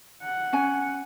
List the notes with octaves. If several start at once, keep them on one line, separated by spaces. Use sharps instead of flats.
F#5
C#4 G#5